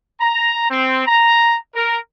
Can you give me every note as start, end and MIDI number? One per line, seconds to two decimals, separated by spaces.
0.21 0.68 82
0.70 1.05 60
1.06 1.56 82
1.76 1.98 70